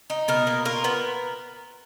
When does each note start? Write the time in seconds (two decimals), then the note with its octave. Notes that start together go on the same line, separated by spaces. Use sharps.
0.10 D#4
0.28 B2 A#4
0.47 A#3
0.65 F4 A#4
0.84 B3